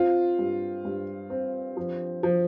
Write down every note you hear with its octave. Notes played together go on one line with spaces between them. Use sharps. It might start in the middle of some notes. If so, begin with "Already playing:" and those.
Already playing: C4 F4
G2
G2
C4
F3
F3